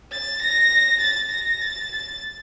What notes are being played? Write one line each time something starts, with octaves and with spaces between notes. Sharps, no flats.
A6
A#6
A6
A#6
A6
A6